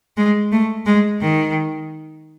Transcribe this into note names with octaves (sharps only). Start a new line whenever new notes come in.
G#3
A3
G#3
D#3